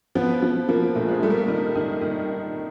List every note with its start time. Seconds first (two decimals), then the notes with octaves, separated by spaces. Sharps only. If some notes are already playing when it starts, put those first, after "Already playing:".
0.15 F3 B3
0.42 F3
0.69 F3 A#3
0.95 A#1 A3
1.08 G#3
1.23 G3 A3
1.30 A#3
1.38 A3
1.48 D#3
1.75 D#3
2.01 D#3